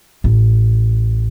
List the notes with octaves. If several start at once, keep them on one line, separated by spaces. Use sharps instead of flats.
A1